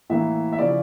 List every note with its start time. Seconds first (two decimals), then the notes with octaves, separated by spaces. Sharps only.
0.10 A2 E3 A#3 E5
0.52 E5
0.58 C#3 F3 C#4 E4 D5